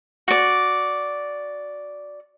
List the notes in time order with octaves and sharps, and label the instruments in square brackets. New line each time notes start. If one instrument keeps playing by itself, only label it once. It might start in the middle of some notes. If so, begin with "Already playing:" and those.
[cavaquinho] F#4 D5